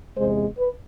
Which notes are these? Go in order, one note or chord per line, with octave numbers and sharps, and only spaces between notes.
E2 C3 G#3 C5
B4